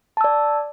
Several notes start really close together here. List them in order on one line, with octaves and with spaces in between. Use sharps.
A5 E6 D5